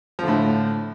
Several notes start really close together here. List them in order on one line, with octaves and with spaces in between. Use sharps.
F3 D3 A2